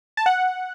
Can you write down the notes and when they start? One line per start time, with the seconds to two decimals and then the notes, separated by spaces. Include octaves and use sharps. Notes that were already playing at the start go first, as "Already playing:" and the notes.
0.17 A5
0.26 F#5